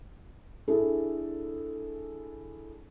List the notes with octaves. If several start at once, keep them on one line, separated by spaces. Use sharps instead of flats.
D4 E4 G#4 A4